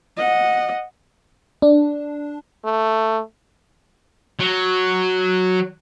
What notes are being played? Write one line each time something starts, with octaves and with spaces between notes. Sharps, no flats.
D#5 F#5
D4
A3
F#3